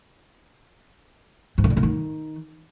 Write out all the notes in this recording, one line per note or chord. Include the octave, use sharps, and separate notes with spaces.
G#2
C#3
D3
C#3
D#3